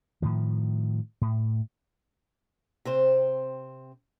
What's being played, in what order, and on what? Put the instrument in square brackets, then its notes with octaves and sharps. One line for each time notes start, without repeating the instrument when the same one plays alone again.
[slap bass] A2 D#3 F3
A2
[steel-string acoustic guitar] C3 C4 C5